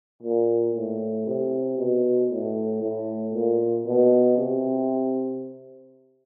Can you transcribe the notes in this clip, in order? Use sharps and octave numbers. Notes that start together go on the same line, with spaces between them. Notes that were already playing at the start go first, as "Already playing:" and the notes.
A#2
A2
C3
B2
A2
A2
A#2
B2
C3